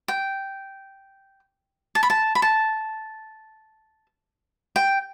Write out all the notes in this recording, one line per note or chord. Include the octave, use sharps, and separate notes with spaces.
G5
A5
B5
A5
B5
A5
G5